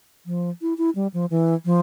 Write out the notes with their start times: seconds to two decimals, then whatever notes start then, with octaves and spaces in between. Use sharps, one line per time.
0.26 F3
0.62 E4
0.78 E4
0.95 G3
1.14 F3
1.30 E3
1.65 F3